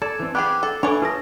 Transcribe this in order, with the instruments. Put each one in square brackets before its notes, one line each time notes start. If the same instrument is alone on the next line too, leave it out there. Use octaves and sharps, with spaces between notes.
[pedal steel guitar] A4 [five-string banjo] D5 [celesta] G#6 E7
[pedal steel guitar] E3 C4
[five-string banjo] B3 G4 G#4 [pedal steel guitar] G5 D6 F#6
[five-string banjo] A4
[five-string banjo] E3 C#5 [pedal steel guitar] D4 [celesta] A4 G#5
[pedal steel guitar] F4 G#4 A4 [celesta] B4 A5 A#6